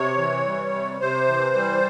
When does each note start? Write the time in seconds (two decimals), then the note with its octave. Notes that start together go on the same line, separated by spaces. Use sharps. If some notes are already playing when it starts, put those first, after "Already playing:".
Already playing: C3 C#5
0.17 E3
0.45 G3
0.72 C3
1.00 C3 C5
1.28 E3
1.55 G3